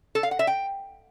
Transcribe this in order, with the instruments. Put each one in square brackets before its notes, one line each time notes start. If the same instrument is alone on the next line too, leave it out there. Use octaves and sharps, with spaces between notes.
[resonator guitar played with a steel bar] A4
F5
F#5
E5
G5